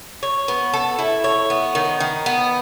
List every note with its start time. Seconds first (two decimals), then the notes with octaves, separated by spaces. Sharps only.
0.23 C#5
0.48 B3
0.74 A4
0.99 E4
1.24 C#5
1.50 B3
1.75 D#3
2.00 D#3
2.26 B3